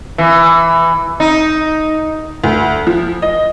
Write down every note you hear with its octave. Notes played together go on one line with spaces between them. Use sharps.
E3
D#4
D2
F3
D#5